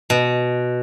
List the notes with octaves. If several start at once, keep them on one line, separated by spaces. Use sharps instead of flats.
B2